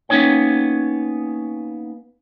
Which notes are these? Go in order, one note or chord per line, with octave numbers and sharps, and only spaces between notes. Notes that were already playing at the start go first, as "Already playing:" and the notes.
A#3 B3 C#4 D#4 C#5 G5